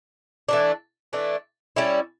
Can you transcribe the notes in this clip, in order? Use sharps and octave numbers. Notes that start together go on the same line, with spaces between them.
E3 A3 D4
E3 A3 D4
G3 C#4 E4